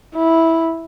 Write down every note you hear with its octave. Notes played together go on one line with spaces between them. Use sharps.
E4